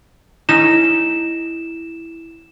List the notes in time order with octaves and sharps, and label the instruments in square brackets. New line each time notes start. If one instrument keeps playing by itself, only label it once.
[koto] A3 C#4 D#4 [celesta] E4 [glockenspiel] E7